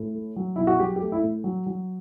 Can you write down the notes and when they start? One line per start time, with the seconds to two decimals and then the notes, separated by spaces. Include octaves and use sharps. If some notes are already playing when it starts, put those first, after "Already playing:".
Already playing: A2
0.15 A3
0.36 F#3
0.56 B1 E4
0.67 F#4
0.79 F#3 G4
0.96 G4
1.01 A3
1.12 E4
1.23 A2
1.44 F#3
1.66 F#3